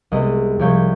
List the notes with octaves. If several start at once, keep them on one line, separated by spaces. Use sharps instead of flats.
C2 G#3 B3 D#5
C2 F3 C#5 G6